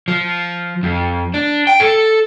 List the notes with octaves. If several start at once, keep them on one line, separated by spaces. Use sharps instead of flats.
F3
F2
D4
G5
A4